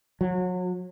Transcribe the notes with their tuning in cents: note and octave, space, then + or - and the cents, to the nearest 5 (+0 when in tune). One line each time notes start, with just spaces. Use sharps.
F#3 -30